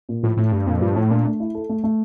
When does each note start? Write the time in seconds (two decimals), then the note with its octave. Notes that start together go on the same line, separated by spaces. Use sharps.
0.09 A#2
0.23 A2 F3
0.37 A2 A3
0.52 G2 D4
0.66 F2 A#2
0.82 G2 F3
0.96 A2 A3
1.10 A#2 D4
1.25 A3
1.40 E4
1.55 A4
1.69 A3
1.84 A3